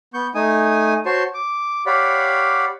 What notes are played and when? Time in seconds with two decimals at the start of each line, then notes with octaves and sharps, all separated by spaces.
0.14 B3 C#6 G6
0.35 A3 D#4 G#5 D#6
1.06 F#4 C5 C#5 A5 C6 C#6
1.34 D6
1.86 G4 C#5 D5 F5 F#5 B5